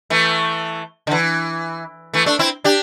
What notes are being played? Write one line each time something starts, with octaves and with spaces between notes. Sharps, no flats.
E3 A3
D3
E3
E3 A3
A3 D4
C4 E4
D4 G4